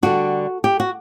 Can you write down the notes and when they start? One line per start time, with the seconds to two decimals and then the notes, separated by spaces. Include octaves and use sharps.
0.03 D3 G3 D4 F#4
0.64 G4
0.80 F#4